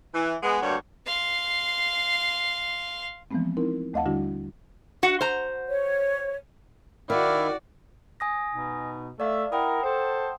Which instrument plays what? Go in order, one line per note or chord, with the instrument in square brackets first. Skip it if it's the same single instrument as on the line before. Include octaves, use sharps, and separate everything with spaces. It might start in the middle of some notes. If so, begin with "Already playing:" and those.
[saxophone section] E3
G#3 B3
D2 G2 G3 A#3 F#4 C#5
[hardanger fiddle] F5 C6
[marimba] E3 F3 G#3 A3 B3 C4
C4 D#4 E4 A#4
D#2 A3 D#5 F5 F#5 A5
D3 G3 D4 E4 F#4
[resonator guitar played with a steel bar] F#4 F#5
C5 A#5
[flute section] C#5
[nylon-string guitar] D#3 [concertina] E4 E5 F5 [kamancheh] F#4 D5
[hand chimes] G#5 D#6 A#6
[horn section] B2 D#4
[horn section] A3 E5 [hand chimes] D5 F5
[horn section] E4 A#4 [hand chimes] F#5 G5 D#6
[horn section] A4 C5